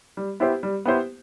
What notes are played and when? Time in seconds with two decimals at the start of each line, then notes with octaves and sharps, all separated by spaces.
0.17 G3
0.40 B3 E4 G4 C5
0.63 G3
0.85 B3 E4 G4 C5